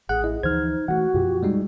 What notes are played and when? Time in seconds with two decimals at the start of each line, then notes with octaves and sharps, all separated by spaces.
0.09 A1 G#4 F#5 F#6
0.24 E4 D#5
0.43 D2 E3 F3 D#4 C5 F6 G#6
0.88 E3 G3 A3 F#4 F#5
1.14 F#2 B2 F3 F4 G4
1.43 G3 G#3 D#4